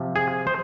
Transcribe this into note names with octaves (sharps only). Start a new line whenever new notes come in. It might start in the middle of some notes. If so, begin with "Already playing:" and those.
Already playing: C3 F3
G#4
C5